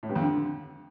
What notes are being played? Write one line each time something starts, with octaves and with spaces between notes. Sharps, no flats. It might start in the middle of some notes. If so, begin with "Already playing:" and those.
A2
G2
F2
D3